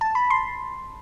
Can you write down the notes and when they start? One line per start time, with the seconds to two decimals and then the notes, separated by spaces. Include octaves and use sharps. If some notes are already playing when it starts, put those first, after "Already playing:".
0.01 A5
0.15 B5
0.30 C6